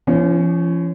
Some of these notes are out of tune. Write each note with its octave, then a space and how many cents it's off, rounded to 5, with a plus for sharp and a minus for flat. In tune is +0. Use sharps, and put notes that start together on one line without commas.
F3 -40 C#4 +0